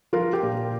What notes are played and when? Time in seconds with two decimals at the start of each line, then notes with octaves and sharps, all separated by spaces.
0.13 F3 F4 A#4
0.33 G4
0.43 A#2